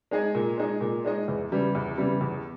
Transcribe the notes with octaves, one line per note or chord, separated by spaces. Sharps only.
G#3 D#4 G#4 D#5
A#2
G#3 D#4 G#4 D#5
A#2
G#3 D#4 G#4 D#5
E2
C#3 E3 G3
E2
C#3 E3 G3
E2